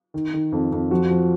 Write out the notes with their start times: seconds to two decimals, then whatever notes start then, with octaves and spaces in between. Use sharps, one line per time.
0.14 D#3
0.33 D#3
0.52 F2
0.72 F2
0.91 F3 F#4
1.11 F3